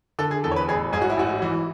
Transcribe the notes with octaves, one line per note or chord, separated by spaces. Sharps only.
D3 A4
G#4
E2 A4
C#5
B4
A1 G#4
G#2 G#4
F#4
E4
A1 F#4
E3